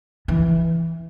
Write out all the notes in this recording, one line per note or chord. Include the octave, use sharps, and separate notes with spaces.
E3